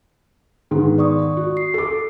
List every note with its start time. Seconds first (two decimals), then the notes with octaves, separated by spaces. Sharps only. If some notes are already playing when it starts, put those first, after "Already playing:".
0.71 G#2 D#3 B3
0.98 D5 C#6 D#6
1.37 F#4
1.57 C7
1.74 A4 D6